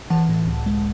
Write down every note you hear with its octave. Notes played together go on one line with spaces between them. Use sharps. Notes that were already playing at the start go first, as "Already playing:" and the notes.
E3 F#5 A5
A2
C#2
G#3